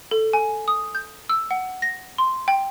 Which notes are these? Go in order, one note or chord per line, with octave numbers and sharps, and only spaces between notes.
A4
G#5
D#6
G6
E6
F#5
A#6
C6
G5